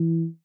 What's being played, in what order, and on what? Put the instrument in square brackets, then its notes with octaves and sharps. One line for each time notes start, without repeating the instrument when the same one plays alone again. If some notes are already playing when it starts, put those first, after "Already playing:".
Already playing: [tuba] E3